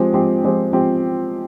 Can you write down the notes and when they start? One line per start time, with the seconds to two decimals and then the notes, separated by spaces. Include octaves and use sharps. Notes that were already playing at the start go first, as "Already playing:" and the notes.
Already playing: F3 G#3 C4 G4 C5
0.13 F3 G#3 C4 G4 C5
0.43 F3 G#3 C4 G4 C5
0.71 F3 G#3 C4 G4 C5